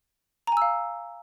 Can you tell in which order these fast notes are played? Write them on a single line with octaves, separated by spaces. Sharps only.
A#5 G#5 E6 F5